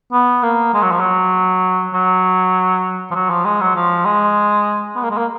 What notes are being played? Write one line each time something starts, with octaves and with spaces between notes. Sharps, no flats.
B3
A#3
G#3
F#3
F3
F#3
F#3
F3
F#3
F3
G#3
F#3
F3
G#3
B3
A#3
G#3
A#3